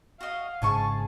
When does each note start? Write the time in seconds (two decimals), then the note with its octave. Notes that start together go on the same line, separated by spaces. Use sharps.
0.21 F#4 D#5 F5
0.62 G#1 G#2 C#3 G#4 G#5 A5 C#6